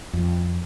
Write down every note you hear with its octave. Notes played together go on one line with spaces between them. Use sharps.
F2